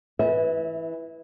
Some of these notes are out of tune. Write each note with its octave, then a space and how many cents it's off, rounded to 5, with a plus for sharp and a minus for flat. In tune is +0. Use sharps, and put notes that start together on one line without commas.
E3 -5 E5 -35